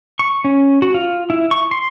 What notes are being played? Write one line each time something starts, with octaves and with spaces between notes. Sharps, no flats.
C#6
C#4
F#4
F4
E4
C#6
C6